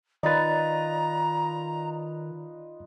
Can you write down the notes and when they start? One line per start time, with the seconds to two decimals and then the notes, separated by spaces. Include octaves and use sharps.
0.23 D#3 D#4 F4 B4 D5 A#5 A6